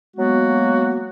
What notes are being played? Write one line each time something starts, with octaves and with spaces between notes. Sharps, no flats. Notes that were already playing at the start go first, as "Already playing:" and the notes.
F#3 G#3 A#3 B3 F#4